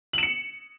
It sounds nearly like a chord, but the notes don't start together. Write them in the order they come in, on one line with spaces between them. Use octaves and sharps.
F#7 E7 C#7